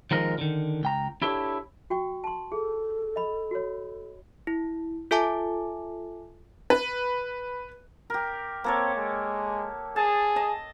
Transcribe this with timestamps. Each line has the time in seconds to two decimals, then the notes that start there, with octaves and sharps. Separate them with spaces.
0.11 D#3 F3 G#3 A#4
0.38 D3 D#3
0.83 C#2 G5 A#5
1.22 D4 E4 G4 A4 C#5
1.90 F#4 G5 C#6
2.24 A5 C6
2.52 G#4 A4
3.16 D#5 B5
3.51 F#4 C#5
4.47 E4
5.11 F4 A4 E5 G#5 A5 D6
6.70 B4
8.10 G4 A#4
8.64 A#3 C4 A4 C#5
8.96 G#3
9.96 G#4 A5
10.36 D#5 A5